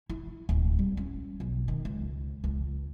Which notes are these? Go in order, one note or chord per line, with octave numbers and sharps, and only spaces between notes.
E4
D1
G3
C#4
B1
D#3
C#2
C#2